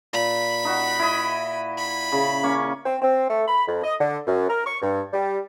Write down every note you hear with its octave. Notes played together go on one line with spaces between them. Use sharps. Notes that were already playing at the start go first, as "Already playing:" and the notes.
A#2 B5
D#4 F#4
E4 D#5
B5
C#3
A#3 C#4 C#6
C4
C4
A3
B5
F2
D#5
D3
F#2
A#4
C#6
G2
G3